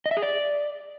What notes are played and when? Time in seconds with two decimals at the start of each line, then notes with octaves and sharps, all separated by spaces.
0.06 D#5
0.11 E5
0.17 G#4
0.22 D5